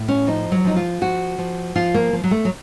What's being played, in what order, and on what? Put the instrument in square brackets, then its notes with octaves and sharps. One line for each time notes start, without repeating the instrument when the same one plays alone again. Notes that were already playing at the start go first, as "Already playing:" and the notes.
Already playing: [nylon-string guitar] A2
C#4
F3 D#4
F#3
F3 D#4
F4
F3 F#4
F3
F3 F4
A#3
F3
F#3
A3
F#3